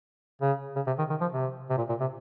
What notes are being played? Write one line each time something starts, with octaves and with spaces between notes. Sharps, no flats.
C#3
C#3
C3
D#3
D#3
F3
C3
C3
A#2
A#2
C3